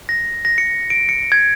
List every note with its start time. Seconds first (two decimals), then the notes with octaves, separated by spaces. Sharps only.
0.09 A#6
0.45 A#6
0.58 C#7
0.90 D7
1.09 C#7
1.32 G#6